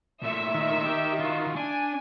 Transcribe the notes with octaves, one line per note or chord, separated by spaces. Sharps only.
A#2 A3 E5
D#3
G4
F4 F#4
D4 G#5